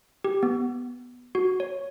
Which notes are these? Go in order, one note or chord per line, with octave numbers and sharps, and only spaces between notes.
G4
B3
F#4
C#5